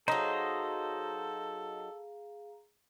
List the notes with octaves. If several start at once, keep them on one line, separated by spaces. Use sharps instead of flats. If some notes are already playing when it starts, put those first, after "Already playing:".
F#3 D#4 G#4 A4 C5 D#5 F5 A#5